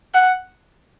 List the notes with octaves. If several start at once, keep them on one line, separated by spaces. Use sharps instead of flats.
F#5